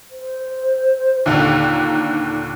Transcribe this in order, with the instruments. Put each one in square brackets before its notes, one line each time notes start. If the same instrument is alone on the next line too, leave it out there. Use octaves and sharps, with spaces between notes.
[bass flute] C5
[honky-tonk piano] D#2 A#2 D3 [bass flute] D#4